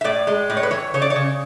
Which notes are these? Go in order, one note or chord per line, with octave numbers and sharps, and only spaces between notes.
E5
A2 D5
G#3
A2 D5
C#5
B4
E3 C#5
C#3 C#5
D5
C#5
C#3